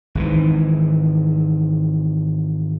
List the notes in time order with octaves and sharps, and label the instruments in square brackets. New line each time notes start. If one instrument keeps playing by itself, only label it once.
[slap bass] G#1 G#2 D#3 E3